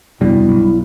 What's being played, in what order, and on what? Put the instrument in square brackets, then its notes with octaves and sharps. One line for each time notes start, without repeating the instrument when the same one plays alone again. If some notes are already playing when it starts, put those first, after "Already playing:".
[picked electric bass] F1 C2 B2 [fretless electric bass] G2 G3 [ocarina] E4
[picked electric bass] B1